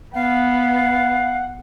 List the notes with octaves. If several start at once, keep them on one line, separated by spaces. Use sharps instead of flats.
B3 F5 F#5